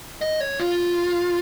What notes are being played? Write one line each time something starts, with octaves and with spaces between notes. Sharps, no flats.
D#5
C#5
F4